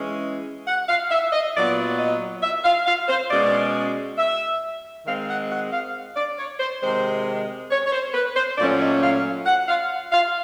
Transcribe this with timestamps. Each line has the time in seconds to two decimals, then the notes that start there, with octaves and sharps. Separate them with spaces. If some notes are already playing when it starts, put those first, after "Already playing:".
Already playing: E3 G#3 C#4
0.67 F#5
0.89 F5
1.11 E5
1.33 D#5
1.55 A#2 F#3 B3 D5
1.99 D#5
2.43 E5
2.65 F5
2.87 F5
3.09 C5
3.31 B2 G#3 C#4 D5
4.18 E5
5.06 D#3 G#3 C4 F5
5.28 F#5
5.50 F#5
5.72 F5
6.16 D5
6.38 C#5
6.60 C5
6.82 C3 D#3 G#3 C5
7.71 C#5
7.86 C#5
7.92 C5
8.14 B4
8.36 C5
8.58 A#2 F#3 A3 C#4 D5
8.80 D#5
9.02 F5
9.46 F#5
9.68 F5
10.12 F5